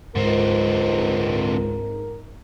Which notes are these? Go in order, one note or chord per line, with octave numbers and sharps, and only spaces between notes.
C#2 G#2 D3 C4 A#4